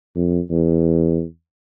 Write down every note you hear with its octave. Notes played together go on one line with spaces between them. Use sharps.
F2
E2